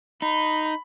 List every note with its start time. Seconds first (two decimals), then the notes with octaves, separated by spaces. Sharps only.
0.22 D#4 B5